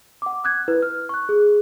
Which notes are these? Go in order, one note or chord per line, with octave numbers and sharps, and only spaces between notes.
F#5 D6
D#6 F#6 G#6
E4 B4
F6
C#6 F#6
G#4